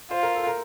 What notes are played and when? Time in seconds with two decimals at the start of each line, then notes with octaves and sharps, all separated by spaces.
0.11 F4 C5
0.23 A#4
0.35 A4
0.47 A#4